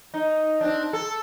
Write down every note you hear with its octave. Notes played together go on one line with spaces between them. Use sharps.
D#4
C4 D4
A4